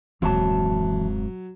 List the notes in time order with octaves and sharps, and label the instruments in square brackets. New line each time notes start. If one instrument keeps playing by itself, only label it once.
[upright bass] D#1 F#2 [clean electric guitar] E3 F#4 A5 [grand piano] F#3 [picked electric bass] G#3 C4